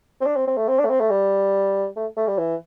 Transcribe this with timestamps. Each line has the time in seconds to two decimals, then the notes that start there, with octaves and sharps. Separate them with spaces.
0.21 C4
0.26 D4
0.36 C4
0.47 C4
0.57 A3
0.68 C4
0.79 D4
0.85 A3
0.90 C4
1.00 A3
1.10 G3
1.96 A3
2.17 A3
2.27 G3
2.38 E3